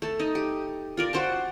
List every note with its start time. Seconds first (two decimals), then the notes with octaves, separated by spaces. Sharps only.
0.02 A3 A5
0.19 D#4 D#5
0.35 G4
0.97 F4 A#4 D5
1.13 F#4 C5 G5 A5